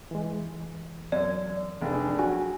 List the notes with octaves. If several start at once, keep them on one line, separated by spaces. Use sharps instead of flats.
E3 G#3
F#2 D5
F1 D4 G#4
F#3 F#4 G#5